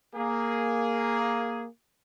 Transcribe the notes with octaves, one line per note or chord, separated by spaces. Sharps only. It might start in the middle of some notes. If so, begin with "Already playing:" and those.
A#3 G#4